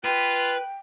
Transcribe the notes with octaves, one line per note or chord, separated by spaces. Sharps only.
F4 B4 G5